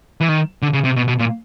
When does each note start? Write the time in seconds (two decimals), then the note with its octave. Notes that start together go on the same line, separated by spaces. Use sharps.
0.21 E3
0.29 D#3
0.62 D3
0.73 C#3
0.85 C3
0.96 B2
1.08 B2
1.19 A#2